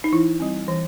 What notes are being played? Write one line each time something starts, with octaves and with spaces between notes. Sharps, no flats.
D#4
E3 E4
G3 C4
E3